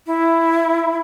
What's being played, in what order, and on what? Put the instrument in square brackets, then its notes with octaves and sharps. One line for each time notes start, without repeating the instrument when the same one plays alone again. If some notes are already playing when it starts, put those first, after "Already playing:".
[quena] E4